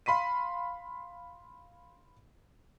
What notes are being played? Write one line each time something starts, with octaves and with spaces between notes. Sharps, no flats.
F5 B5 C6 B6 D#7